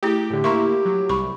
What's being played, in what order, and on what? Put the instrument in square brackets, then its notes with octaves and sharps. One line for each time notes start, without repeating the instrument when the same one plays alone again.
[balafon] A3 E4 G#4 [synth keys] G4
[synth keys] A2 D3 [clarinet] G4
[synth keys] A#3 E4 [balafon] A#5 C6 C#6
[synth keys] F#3
[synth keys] C2 [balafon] B5 C#6